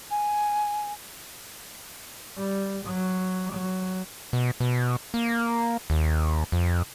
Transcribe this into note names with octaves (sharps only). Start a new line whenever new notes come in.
G#5
G3
F#3
F#3
B2
B2
A#3
D#2
F2